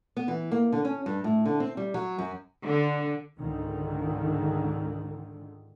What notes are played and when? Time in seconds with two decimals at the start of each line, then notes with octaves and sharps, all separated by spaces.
0.17 B3
0.28 E3
0.52 A#3
0.72 D3
0.85 C#4
1.06 G2
1.24 A2
1.46 D3
1.60 C4
1.77 G3
1.94 F#3
2.18 F#2
2.65 D3
3.37 C#2 G#2 D3 D#3